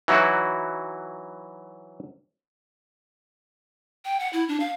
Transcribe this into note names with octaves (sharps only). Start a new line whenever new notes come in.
E3 F#3 D#4 E4 F#4
G5
F#5
E4
D4
F5